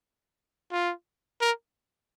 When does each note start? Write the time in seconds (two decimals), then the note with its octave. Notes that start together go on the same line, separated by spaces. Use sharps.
0.72 F4
1.41 A#4